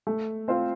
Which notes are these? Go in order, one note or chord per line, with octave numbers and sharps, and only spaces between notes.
A3
C4 F4 C5 F5